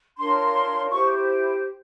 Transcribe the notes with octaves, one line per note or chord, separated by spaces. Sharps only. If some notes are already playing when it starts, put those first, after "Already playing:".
D4 F4 A#4 C#5 C6
E4 G4 C5 C#6